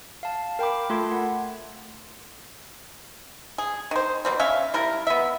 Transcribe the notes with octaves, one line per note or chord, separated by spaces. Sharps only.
F5 A5
A#4 G5 B5 D6
A3 F4 A4 A5 C6 G#6
F#5
G#4
D#3 C5
B2 G3 C4
C#4 E5 F5
G3 E4 A#4
B3 E5